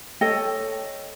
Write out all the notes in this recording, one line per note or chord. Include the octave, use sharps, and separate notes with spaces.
A4 C#5 D#5 G5